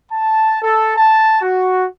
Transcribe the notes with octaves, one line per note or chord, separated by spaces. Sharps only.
A5
A4
A5
F#4